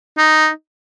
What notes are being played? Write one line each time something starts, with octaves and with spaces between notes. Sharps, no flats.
D#4